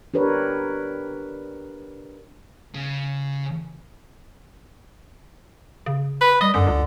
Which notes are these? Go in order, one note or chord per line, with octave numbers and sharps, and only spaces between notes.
D4 G4 A#4 B4 C#5
C#3
C#3
B4
G3 D#5
F#2 D3
C#2